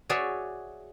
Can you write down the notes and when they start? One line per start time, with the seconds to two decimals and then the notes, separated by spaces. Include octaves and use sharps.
0.10 F#4 G#4 C#5 D5 E5